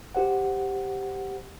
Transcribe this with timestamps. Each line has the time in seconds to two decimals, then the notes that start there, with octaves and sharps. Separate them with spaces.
0.15 G4 C5 F#5